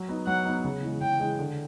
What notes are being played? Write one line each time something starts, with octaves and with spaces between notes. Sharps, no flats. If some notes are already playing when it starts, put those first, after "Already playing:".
Already playing: F#3
B3 D#4
F#3 F#5
B3 D#4
C#3
E3 G#3
C#3 G5
E3 G#3
D3